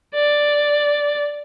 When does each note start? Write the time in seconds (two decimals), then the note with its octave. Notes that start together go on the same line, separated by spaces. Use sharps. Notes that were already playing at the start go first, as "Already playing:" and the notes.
0.14 D5